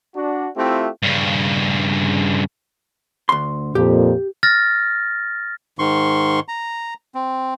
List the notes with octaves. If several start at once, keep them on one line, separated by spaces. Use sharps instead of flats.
D4 F#4
A3 C4 E4 F4 G4
G2 C#3
D2 C6
F2 A#2 G4
F6 A6 A#6
G#2 D#3 C6 C#6
A#5
C4